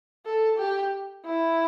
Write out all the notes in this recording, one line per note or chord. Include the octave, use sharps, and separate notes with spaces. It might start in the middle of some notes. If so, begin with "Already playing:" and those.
A4
G4
E4